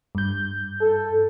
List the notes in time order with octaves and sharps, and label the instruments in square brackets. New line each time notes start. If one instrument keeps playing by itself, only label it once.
[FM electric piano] G2 G6
[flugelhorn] A4